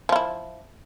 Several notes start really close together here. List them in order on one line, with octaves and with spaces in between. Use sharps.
F3 F4 E4